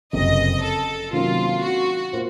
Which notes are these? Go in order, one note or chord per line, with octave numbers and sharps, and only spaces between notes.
F#1 F2 C3 D#5
A4
C3 D#3 F#3 A#3 C#4 F4
F#4
A#3 F4 C5